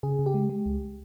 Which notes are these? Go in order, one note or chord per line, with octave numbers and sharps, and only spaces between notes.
C#3 G#4
C#3
G4
G#3
G#3
C#2